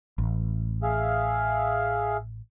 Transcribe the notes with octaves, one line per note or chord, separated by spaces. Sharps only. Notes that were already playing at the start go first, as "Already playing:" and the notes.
A1
G#4 E5 F5